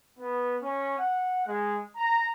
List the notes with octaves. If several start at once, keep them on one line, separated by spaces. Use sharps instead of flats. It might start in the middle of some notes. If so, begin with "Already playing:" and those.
B3
C#4
F#5
G#3
A#5